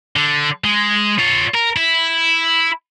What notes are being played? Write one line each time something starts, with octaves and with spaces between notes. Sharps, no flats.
D3
G#3
F4 C#5
A#4
E4